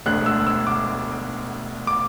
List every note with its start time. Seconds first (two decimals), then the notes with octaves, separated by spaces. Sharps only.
0.06 E1 D2 D3 F#6
0.26 E6
0.47 E6
0.67 D6
1.87 D6